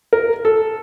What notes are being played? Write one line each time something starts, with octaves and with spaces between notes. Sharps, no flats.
A#4
A4